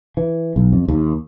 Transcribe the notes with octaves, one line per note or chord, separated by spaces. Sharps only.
E3
B1
F2
D#2